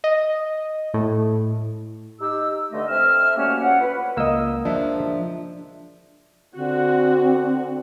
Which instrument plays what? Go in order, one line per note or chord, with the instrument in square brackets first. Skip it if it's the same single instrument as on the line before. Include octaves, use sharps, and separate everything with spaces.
[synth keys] D#5
A2
[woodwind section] D#4 G4 E6
G2 D3 A3 D#5
A3 C4 E5 E6 F6
F#3 G3 A3 A#3 C#4
D2 C#4 F4 F#5
B4
[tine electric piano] C#2 E6 [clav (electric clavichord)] A#3 D#5
[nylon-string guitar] F3 G#3 [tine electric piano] D4 E5
[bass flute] D3 [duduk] C4 [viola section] F#4